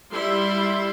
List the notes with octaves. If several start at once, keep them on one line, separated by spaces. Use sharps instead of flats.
G3 E4 E5 C6